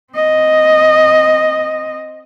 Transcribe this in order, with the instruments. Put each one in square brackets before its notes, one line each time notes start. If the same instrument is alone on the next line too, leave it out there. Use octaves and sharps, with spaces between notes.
[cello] C4 D#5